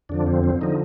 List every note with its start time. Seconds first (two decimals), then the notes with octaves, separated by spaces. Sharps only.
0.09 F2 D3 F3 D4
0.27 C4
0.44 C4
0.61 D3 F3 D#4